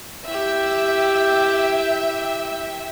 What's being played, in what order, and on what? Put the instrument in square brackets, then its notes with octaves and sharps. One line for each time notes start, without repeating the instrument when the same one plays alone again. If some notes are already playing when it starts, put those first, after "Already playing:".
[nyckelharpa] E4 G4 [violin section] E5 G5